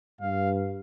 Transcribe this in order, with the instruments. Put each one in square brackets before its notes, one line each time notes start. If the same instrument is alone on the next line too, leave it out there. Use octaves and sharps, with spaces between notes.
[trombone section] G2 [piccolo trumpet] F5